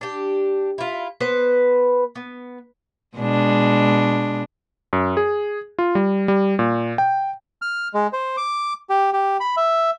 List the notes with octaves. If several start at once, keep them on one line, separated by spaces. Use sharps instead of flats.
D4 G4
E4 F4
B3 B4 C5
B3
B2 G#3 D4
F#2
G#4
F4
G3
G3
A#2
G5
F6
G#3
C5
D6
G4
G4
B5
E5